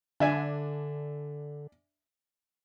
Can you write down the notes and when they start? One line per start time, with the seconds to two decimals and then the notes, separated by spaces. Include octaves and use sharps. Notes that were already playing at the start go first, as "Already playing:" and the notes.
0.20 D3 D4 E5 G#5